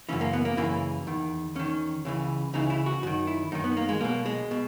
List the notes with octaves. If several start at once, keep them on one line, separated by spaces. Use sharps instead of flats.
F#2 C#3 E3 C#4
A#3
B3
A#3
F#2 C#3 E3 A#3
E2 D#3
E2 D#3 C#4
C#2 C#3 E3
C#2 C#3 E3 D#4
E4
F#4
F#2 D#3 F#4
E4
F#2 D#3 D#4
B3
A#3
G#3
B1 B2 A#3
G#3
B2